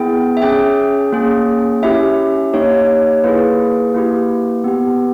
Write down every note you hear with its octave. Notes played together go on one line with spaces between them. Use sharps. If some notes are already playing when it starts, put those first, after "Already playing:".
Already playing: B3 E4 G#4 G5
E5
C#4 G#4 G5
A#3 C#4 G#4
C#4 E4 G4 E5
A#3 D#4 G4 C#5
A#3 E4 G#4 B4
A#3 E4 G4
B3 G4